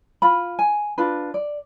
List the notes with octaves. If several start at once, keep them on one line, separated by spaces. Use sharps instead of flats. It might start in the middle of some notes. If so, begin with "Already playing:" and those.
F4 B5
G#5
D4 F4 B4
D5